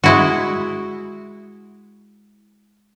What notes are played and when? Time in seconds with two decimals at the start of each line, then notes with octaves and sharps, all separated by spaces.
0.04 G#3 E4 F#4